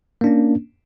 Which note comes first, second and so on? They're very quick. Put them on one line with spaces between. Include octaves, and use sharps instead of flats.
A#3 D4 C#4